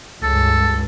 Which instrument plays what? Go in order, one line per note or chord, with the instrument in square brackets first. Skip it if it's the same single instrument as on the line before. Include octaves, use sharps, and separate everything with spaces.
[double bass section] C#2 G2 [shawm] A4